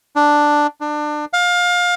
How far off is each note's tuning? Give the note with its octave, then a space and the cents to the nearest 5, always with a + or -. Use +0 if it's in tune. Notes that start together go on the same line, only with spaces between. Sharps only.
D4 +5
D4 +25
F5 +25